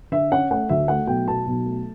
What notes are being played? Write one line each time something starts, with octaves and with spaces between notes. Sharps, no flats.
D3 E5
C#4 F#5
A3 F#5
D2 E5
A3 F#5
B1 G5
B2 A5
B1
A3